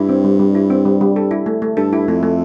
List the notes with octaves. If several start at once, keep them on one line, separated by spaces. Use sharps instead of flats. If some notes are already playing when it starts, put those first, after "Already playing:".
Already playing: G2 E4
C4
G3
G3
E4
C4
G3
G3
A4
E4
A3
A3
G2 A4
E4
F2 A3
A3